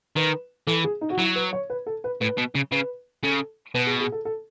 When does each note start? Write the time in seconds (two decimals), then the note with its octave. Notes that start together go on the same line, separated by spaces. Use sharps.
0.16 D#3 B4
0.67 E3 A4
0.84 G#4
1.01 D#4
1.10 F#4
1.18 F#3 E4
1.35 B4
1.53 C#5
1.70 B4
1.86 A4
2.04 B4
2.21 A2 B4
2.38 B2
2.55 C#3
2.72 C#3 B4
3.23 C#3 A4
3.74 B2 B4
3.87 G#4
4.00 G#4
4.12 A4
4.25 A4